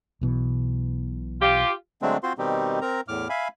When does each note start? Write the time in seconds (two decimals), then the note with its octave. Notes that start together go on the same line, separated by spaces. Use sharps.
0.21 B1 B2 E3
1.41 F4 G4
2.02 D3 F#3 G#3 A3 C4 D4
2.23 C4 F4 F#4 C5 C6
2.38 B2 D#3 G3 C4 D#4 G4
2.81 C4 A#4 A#5
3.08 E2 A2 D6 F6
3.29 E5 F5 G#5 B5